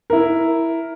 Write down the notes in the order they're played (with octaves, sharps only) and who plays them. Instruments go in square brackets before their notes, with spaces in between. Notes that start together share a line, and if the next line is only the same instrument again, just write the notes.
[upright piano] E4 A#4